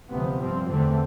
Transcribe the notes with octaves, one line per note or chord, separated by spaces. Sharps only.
D2 C3 F3 B3
G2 F3 C4
E2 D3 A3 C4